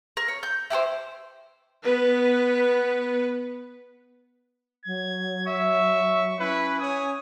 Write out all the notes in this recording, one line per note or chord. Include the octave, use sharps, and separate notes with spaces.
A#4
C#5
G6
E4 G4 A#4 C5
B3 B4
F#3 G#6
E5 C#6
C#4 E4 B4
C#5 G#5 D#6